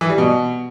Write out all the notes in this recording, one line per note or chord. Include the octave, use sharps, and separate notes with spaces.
E3
G3
B2